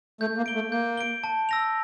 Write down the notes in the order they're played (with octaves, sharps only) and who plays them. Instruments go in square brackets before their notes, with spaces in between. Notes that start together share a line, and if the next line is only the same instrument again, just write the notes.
[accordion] A3 [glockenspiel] G6
[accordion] A#3
[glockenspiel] D7 G7
[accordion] A3
[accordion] A#3 [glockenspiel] G6
[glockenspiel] D7 G7
A5
E6 A#6 F7